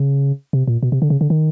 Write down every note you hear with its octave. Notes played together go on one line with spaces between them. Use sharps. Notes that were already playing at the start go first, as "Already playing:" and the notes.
Already playing: C#3
C3
A#2
B2
C3
D3
C#3
D3
D#3